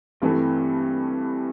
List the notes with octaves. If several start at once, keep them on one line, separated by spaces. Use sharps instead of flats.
G2 E3 A3 C4